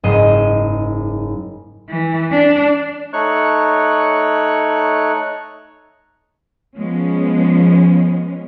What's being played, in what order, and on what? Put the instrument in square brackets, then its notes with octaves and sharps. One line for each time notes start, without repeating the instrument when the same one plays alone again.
[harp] F#1 G#2 D#5 C7 E7
[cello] E3
D4
[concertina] A3 D#4 C#5 C#6 F#6
[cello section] F3 G#3 B3 C#4